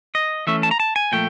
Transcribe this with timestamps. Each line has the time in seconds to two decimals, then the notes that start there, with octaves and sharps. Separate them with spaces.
0.15 D#5
0.47 E3 A3 C#4 E5
0.63 A5
0.71 A#5
0.80 A5
0.96 G#5
1.12 A#2 F3 A3 G5